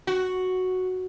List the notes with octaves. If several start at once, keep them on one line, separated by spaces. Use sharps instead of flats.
F#4